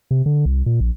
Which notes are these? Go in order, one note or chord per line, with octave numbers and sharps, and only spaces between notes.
C3
D3
C2
A#2
A#1